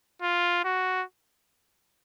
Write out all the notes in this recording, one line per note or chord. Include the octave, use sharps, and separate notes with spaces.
F4
F#4